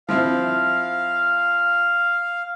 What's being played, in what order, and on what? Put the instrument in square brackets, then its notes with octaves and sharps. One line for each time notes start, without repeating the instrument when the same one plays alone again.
[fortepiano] F3 C4 E4 [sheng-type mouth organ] F5